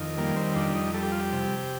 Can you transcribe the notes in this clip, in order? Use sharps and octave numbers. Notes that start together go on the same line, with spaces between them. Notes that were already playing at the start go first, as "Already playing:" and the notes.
Already playing: F2 D#3
G3 A#3
C4
F2 D4
D#4
G3 A4
G4
F4
G4
C3